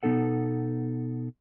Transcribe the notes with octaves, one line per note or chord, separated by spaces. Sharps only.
B2 B3 D#4 A4 F#5